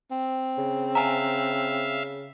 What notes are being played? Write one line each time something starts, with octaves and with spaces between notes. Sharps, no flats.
C4
C#3
E5 F5 G#5 A#5